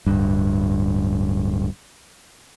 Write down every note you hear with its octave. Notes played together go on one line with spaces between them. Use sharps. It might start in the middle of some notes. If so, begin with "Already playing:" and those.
D1 G2